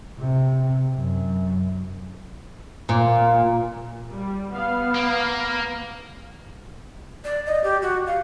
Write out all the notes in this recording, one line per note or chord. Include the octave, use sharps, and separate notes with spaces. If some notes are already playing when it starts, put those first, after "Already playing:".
C3
F#2
A#2
G3
B3 F5
A#3
D5
D#5
G4
F#4
F5